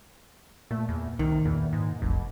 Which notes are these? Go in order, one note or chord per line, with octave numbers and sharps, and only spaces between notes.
A#2 A3
E2
C2 D#3
E2 A#2
G#2
F1 B1